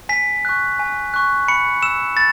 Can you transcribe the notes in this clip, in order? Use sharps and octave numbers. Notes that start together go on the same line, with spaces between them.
G#5 B6
C#6 F#6
G#5
C#6 F#6
B5 C#7
E6 E7
B5 A6